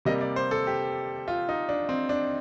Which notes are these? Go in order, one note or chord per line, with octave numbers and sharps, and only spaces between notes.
C3 G3 A#3 D#5
D5
C5
A4
G4
F4
D#4
D4
C4
D4